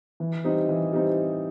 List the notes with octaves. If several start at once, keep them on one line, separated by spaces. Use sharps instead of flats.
E3
G3 C4 D#4
E3
G3 C4 D#4